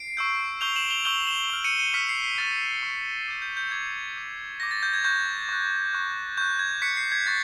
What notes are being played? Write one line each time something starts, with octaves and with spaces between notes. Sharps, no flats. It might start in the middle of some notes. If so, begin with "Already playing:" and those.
Already playing: C7 D7
C#6 E6 G6
C#6 E6 G6 F7 G7
E7 F#7
F7 G7
C#6 E6 G6 F7 G7
E7 F#7
C#6 F6
C#7 D#7
C#7 D#7
C#6 F6 B6 C#7
C7
C7
C#6 F6 A6
C#6 F6
D6 G6
G6
G6
D6 G6 G#6
D6 G6
D6 G6 A#6
A6
G6
G#6
C#6 F#6 G6
C#6 F#6
C#6 F#6
C#6 F#6 G6
G#6
C#6 F#6 B6 C#7
C7
G#6
C#6 F#6 A6